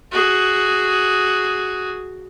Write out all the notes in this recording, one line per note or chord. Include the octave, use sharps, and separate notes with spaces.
F#4 G#4